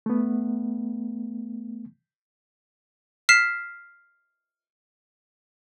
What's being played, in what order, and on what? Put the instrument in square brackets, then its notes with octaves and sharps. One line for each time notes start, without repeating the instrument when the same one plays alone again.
[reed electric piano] A3 B3
[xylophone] F6 B6 C7 E7